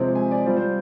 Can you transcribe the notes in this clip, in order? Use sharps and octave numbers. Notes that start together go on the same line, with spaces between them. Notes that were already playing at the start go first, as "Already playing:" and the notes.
Already playing: C3 F3 G#3 C4
G#5
D5
G3 C4 F4 D5
C5